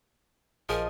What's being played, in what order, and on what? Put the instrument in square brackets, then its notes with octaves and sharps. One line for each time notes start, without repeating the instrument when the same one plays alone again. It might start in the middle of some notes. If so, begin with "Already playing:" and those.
[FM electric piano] A#1 G#4 D#6 [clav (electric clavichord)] F3 [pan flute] A#4 [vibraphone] D#5